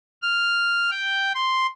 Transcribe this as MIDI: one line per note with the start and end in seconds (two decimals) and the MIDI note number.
0.22 0.90 89
0.90 1.32 79
1.35 1.67 84